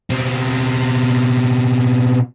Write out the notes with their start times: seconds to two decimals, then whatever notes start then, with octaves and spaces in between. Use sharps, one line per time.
0.10 B2 C4